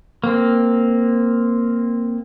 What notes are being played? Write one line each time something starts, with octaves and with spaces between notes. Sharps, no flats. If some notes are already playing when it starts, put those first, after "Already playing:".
A#3 C4